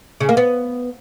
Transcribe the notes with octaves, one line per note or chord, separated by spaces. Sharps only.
C#3
A#3
B3